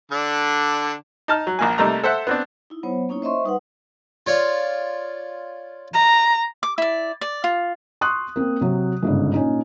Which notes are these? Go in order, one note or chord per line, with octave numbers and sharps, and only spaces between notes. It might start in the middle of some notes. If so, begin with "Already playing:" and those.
D3 D4
D#4 A5 F6
F#3
A#1 A#3 G#5
C3 G3 A3 A#3 D#4 A#5
A4 C5 E5 F#5
B3 C4 D4
D#4 E4
F#3 B3 C5 C#5
A#3 C#4 D#4 E4 C#5
C5 D#5 E5 C6 C#6
G3 D#4 B4 F#5
F4 C#5 D5
A#5
D6
E4 D5
D5
F4
C6 C#6 D#6 F#6
A#3 C4
C3 F#3
G1 G#2 C#3
A#2 C#4 D#4